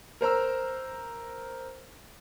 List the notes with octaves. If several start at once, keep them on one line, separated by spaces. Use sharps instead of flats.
A#4 C5 A#5 E6